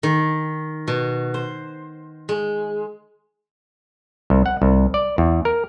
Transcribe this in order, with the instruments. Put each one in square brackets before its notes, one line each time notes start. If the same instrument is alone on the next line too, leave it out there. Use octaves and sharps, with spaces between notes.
[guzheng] D#3
B2
C5
G#3
[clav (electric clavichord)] C2
F#5
C2
D5
E2
A#4